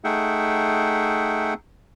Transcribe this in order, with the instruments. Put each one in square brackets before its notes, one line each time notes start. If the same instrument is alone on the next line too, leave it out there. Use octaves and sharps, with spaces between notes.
[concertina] A3 D#4 G#4 E5 F#5 G5